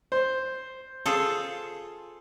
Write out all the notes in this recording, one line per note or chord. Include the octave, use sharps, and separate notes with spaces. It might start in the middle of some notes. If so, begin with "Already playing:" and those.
C5
F4 G#4 A4